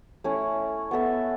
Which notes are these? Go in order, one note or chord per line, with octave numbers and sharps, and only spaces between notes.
A3 C#4 E4
B3 A4 E5